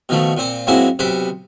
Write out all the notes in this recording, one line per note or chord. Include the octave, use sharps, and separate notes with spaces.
B2 D#3 F3 A3
A#2 C4 C5
F#2 G#3 A#3 C4 E4 F#4
B1 C3 G4 B4 C5